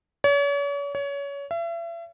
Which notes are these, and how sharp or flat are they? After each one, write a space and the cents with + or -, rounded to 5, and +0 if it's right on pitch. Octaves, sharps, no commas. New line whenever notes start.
C#5 +40
C#5 +25
E5 +40